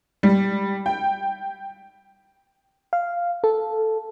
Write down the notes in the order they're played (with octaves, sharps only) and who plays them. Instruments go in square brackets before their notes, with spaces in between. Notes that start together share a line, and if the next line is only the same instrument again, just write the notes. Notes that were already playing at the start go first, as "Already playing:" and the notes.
[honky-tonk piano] G3
G5
[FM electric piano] F5
A4